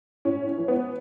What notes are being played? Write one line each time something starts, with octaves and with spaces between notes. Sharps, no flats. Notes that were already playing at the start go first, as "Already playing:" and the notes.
A2 C#4
C#4
E3
B3